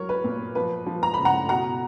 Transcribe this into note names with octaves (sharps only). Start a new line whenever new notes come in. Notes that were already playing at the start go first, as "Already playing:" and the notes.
Already playing: F#3 A#4 C#5
B4
A#2
F3 B4
F3
A#5
C#3 B5
F#5 A#5
B2 F#5 A#5